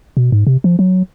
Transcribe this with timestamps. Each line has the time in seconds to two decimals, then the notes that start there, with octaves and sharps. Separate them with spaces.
0.17 B2
0.32 G#2
0.47 C3
0.64 F3
0.79 F#3